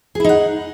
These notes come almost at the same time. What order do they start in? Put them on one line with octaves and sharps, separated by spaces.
G#4 E4 D#4 F#5